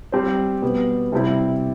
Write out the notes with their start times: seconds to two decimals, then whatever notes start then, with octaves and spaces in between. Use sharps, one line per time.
0.12 G3 C4 G4 C5
0.62 B2 G3 B3
1.12 C3 G3 C4 E4